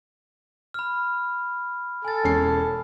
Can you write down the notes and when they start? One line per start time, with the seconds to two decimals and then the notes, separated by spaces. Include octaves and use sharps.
0.74 B5 F6
2.05 A4 G#5 A6
2.24 E1 C#4 C7